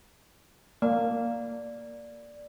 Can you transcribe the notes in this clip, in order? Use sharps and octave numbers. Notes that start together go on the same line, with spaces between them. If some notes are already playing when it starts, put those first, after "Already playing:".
A#3 D5